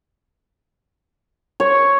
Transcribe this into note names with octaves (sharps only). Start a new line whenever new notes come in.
C#5